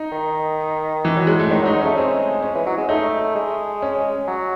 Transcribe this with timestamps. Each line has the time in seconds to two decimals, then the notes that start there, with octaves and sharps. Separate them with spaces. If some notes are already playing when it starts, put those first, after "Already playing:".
Already playing: D#4
0.12 D#3
1.05 E3
1.17 F#3
1.27 G#3
1.39 A3
1.51 D#3 C#4
1.62 F#3 D#4
1.74 G#3
1.82 A3 C#4
1.97 G#3 C4
2.43 C#4
2.55 E3
2.67 F#3
2.78 G#3
2.89 A3 D#4
3.35 G#3
3.82 C#4
4.28 F#3